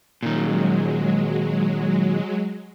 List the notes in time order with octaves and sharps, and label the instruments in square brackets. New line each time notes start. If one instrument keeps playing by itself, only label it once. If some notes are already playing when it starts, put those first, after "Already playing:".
[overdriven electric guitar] A#2 D#3 [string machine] F#3 G#3